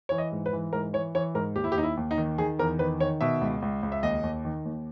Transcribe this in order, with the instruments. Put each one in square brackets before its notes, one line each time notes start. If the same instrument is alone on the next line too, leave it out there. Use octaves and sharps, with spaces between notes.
[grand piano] E3 C#5
D#5
G#2
B4
E3
G#2 A#4
E3 C#5
E3 C#5
G#2 A#4
D#2 G4
E4
G4
D#2 D#4
E4
D#2
D#4
D#3
D#3 G#4
E2 A#4
D#3 B4
D#3 C#5
B2 E5
C#2
C#2
C#2
E5
D#2 D#5
D#2
D#3
D#2